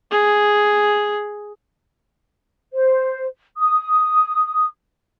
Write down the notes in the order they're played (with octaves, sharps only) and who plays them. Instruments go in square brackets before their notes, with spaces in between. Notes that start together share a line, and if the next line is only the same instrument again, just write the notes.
[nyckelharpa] G#4
[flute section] C5
D#6